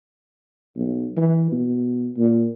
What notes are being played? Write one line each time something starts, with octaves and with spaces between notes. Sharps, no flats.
B1
E3
B2
A#2